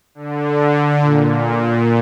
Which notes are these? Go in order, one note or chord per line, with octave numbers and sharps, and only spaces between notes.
D3
A#2